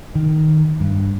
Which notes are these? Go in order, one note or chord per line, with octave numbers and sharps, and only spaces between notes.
D#3
G2